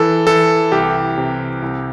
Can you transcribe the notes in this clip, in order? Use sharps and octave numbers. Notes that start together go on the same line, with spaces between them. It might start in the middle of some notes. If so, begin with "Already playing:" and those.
Already playing: E3 A4
E3 A4
C2 G4
C3
C2